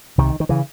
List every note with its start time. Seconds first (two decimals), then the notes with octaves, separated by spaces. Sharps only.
0.18 C2 C3 D#3
0.40 D#3
0.49 C#3 E3